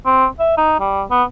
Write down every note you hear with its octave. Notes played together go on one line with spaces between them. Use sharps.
C4
E5
D#4
G3
B3